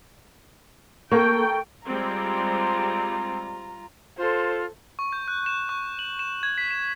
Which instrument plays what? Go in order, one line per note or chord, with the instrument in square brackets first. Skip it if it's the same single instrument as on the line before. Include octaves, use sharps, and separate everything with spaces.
[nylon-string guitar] A#3 [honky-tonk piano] A4 A#4 C#6 [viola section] G5
[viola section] G3 G#3 C4 [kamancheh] F4 A#5
[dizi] F4 [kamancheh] A4 C5
[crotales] C#6
G6
F#6
E7
C#6
F#7
E7
G#6
B6
E7